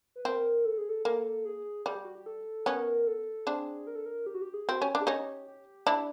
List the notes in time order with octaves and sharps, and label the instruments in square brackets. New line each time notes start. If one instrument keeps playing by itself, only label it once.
[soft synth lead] B4
[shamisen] C4 [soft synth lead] A#4
[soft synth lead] A4
G#4
A4
[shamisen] A#3 [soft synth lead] A4
[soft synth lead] G#4
[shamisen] G3 [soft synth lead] G#4
[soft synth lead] G4
F#4
G4
A4
[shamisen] B3 C#4 [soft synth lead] A#4
[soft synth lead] A4
[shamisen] C4 D4 [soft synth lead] G#4
[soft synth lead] A#4
A4
A#4
G4
F#4
G4
G#4
[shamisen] C4 [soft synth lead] F#4
[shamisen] C#4 [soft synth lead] G4
[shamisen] D4
[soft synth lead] G#4
[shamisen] C#4 D#4 [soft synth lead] G4
[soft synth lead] G4
[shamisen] D4 E4